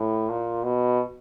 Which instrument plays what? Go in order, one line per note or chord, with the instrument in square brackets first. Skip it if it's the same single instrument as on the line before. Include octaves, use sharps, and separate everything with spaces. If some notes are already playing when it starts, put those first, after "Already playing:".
Already playing: [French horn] A2
A#2
B2